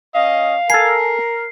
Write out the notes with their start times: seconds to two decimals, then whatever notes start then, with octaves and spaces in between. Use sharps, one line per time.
0.15 C#4 D#5 F5
0.70 A4 A#4 G#5 C7